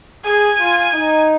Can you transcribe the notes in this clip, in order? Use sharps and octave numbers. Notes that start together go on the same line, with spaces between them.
G#4 G#5
F4
D#4